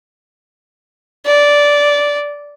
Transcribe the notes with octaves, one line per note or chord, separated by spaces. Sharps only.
D5